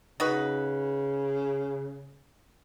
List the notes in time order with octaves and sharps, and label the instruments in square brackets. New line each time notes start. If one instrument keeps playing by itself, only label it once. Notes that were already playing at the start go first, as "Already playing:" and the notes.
[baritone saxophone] C#3 [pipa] D#4 F#4 B4